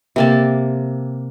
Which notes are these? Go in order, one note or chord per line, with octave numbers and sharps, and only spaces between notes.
C3 A#3 A5